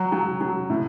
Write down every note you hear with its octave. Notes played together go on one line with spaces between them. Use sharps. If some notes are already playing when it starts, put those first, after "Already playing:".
Already playing: F#3
F#3
F#3
A2